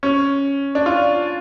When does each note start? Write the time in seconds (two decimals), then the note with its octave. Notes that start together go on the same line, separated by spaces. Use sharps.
0.03 C#4
0.75 D4
0.86 F4